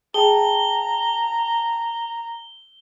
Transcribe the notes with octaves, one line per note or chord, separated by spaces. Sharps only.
G#4 G5 A5 A#5 G7